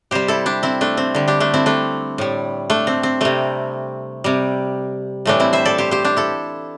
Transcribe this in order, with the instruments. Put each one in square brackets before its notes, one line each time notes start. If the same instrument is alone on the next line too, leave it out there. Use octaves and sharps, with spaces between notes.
[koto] C3 G3 G4 C5
E4 A4
D4 G4
C4 E4
A3 D4
C4
D3 G3
D4 G4
A3 D4
C4 E4
A3 D4
A2 G3
A3 D4
C4
C4
C3 G3 A3
C3 G3
A2 E3 G3 A3 D4
C4 E4
C5 E5
A4 D5
G4 C5
G4 C5
D4 G4
E4 A4